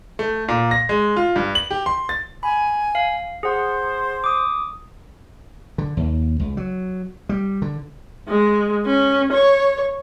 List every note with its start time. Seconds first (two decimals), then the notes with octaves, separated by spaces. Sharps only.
0.19 A3
0.48 A#2
0.71 A#6
0.89 G#3
1.16 F4
1.36 G2
1.55 F#7
1.71 G4
1.86 C6
2.09 A6
2.43 G#5 B5
2.95 F5
3.43 G#4 C5 F#5
4.24 D6 D#6
5.78 D3
5.97 D#2
6.40 C#2
6.57 F#3
7.29 G3
7.62 D3
8.27 G#3
8.86 C#4
9.32 C#5